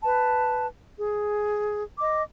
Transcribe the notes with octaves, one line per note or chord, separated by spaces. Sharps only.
B4 A5
G#4
D#5 D6